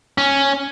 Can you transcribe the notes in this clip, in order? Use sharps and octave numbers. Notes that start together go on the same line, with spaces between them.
C#4